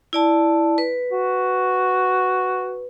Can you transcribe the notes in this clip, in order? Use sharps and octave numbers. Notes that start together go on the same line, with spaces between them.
E4 D5 A5
B4
F#4